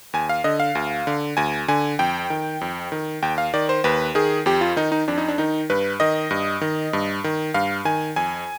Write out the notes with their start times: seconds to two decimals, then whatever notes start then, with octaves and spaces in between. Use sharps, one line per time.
0.13 D#2 G#5
0.29 F5
0.44 D3 D#5
0.60 F5
0.75 D2
1.07 D3
1.37 D2 G#5
1.68 D3 G#5
1.99 F2 G5
2.30 D#3
2.61 F2
2.92 D#3
3.22 D#2 G5
3.38 F5
3.54 D#3 D5
3.69 C5
3.84 D#2 B4
4.15 D#3 G#4
4.46 F2 G4
4.61 F4
4.76 D#3 D#4
4.92 D#4
5.08 F2 D4
5.18 D#4
5.28 D4
5.38 D#3 D#4
5.70 G2 B4
6.00 D#3 D#5
6.31 G2
6.61 D#3
6.93 G2
7.24 D#3
7.54 G2 F5
7.85 D#3 G#5
8.16 F2 G#5